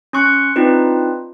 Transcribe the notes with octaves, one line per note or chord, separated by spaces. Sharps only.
C#4 C6 C#6 F#6 C#7
C4 D4 D#4 F4 B4